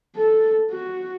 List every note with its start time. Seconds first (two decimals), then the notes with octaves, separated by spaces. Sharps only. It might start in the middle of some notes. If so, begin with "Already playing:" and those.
0.16 A4
0.71 F#4